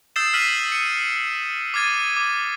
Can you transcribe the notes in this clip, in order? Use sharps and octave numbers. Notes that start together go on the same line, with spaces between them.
D#6 E6 G6 A6 C7 E7
E6 F6 B6 C7 D#7 F#7
C#7 D#7
D6 F6 G#6 A6 D#7
D#7
D6